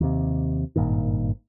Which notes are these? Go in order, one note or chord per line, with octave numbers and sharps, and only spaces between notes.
D#2 C3
G#1 G2 A#2 D#3